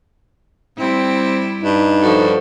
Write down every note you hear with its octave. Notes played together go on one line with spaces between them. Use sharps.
G3 C4 E4
G2 D#4
F3 F#4 A4